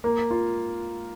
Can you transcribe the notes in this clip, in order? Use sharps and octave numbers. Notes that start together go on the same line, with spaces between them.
A#3
F4